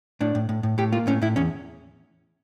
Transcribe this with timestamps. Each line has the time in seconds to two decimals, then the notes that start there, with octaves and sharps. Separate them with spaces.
0.21 A2 D4
0.35 A2
0.49 A2
0.63 A2
0.78 A2 G4
0.92 A#3 F4
1.07 A2 C#4
1.22 A2 E4
1.36 E2 C#4